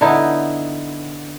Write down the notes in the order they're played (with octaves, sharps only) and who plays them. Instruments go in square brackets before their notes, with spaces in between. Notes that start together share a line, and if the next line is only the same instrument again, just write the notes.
[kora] D3 B3 D#4 E4